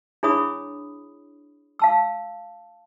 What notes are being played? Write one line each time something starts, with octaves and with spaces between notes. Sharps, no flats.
D4 E4 G#4 C#5 B5 D#6
F5 A5 E6